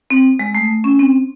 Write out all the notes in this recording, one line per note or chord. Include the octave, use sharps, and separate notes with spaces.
C4
G#3
A3
C#4
C4